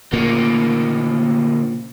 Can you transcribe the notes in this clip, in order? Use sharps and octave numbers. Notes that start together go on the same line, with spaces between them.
D2 A#2 C#3 A#3